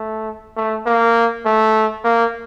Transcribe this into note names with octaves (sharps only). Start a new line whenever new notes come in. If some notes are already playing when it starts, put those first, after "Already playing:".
Already playing: A3
A3
A#3
A3
A#3